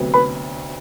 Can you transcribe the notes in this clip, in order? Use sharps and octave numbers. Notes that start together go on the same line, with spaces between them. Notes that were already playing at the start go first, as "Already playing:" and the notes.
Already playing: D2 C3 F#3 B3
B4 B5